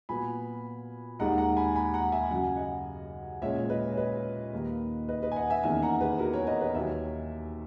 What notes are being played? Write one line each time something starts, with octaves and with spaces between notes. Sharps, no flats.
A#2 F#3 B3 G#5 B5
D#2 D#3 G#3 F#5 A#5
F#5 A#5
G#5 B5
G#5 B5
F#5 A#5
E5 G#5
F#2 C#3 F#3 F#5
G#5
D#5 F#5
A#2 G#3 C#4 C#5 E5
C#5
B4 D#5
C#5
B4 D#5
D#2 D#3 A#3
B4 D#5
B4 D#5
G#5
D#5 F#5
E5 G#5
E2 D#3 A#3 C#4 E5 G#5
F#5 A#5
G#4 B4
F#4 A#4
A#4 C#5
B4 D#5
B4 D#5
D#2 D#3 F#3 C#5 E5